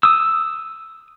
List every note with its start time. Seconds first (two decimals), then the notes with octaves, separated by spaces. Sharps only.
0.03 D#6 E6